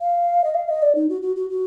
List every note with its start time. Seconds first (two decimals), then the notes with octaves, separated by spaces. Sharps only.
0.01 F5
0.44 D#5
0.54 F5
0.69 D#5
0.82 D5
0.95 D#4
1.09 F#4
1.22 F#4
1.36 F#4
1.50 F#4